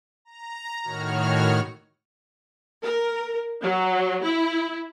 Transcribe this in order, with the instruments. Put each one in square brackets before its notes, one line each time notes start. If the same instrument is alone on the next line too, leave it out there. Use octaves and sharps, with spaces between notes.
[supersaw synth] A#5
A2 D#3 F#4 C#5 F6
[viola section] A#4
F#3
E4